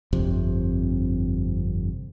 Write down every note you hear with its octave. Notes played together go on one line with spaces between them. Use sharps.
G1 F2 C3